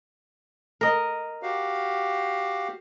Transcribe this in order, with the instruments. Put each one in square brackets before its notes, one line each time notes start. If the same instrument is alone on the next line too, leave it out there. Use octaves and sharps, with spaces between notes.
[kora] A#4 D#5
[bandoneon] F#4 G4 F5